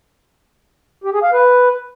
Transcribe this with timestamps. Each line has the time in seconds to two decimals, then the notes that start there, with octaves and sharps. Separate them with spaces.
1.04 G4
1.13 G#4
1.23 F5
1.33 B4